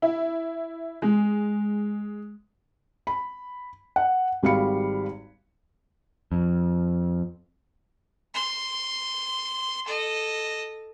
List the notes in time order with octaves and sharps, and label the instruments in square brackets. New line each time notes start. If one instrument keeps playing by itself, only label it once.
[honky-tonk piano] E4
G#3
[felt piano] B5
F#5
G#1 G3 F#4 F5 B5 C#7
[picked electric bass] F2
[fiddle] C6
A4 D#5